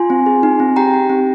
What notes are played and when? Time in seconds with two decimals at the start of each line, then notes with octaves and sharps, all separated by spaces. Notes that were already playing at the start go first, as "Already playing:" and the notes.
Already playing: F4 G#5 C6
0.10 C4
0.26 G#4
0.43 D#4
0.60 C4
0.76 G4 G5 A#5
0.93 G4
1.10 C4